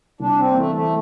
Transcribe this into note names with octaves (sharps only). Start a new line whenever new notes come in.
C2 D4
C4
A#3
E3 A3
A3